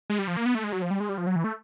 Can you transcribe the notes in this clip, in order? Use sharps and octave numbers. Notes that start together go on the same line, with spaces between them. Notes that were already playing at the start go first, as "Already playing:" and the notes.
G#3
G3
F3
A#3
B3
A3
G#3
F#3
F3
G3
G#3
G3
F3
F#3
E3
A3